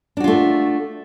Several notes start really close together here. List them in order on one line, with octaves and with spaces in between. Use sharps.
D4 F#4 F4 A3